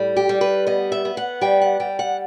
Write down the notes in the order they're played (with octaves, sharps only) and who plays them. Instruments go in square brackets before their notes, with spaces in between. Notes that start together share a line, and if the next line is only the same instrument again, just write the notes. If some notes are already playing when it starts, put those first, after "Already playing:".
Already playing: [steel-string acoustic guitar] A2 G3
G4
G3
B4
B3 D#5
E5
B3
F#5
G3 G5
F#5
G3 G5
F#5